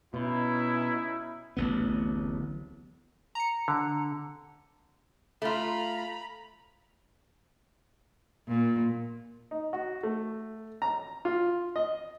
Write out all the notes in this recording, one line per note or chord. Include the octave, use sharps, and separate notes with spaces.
B2 C#4 D#4 E4
D1 A1 B3
A#5 C#7
D3
A3 F4 A#5 B5
A#2
D#4
F#4
A3
A#5
F4
D#5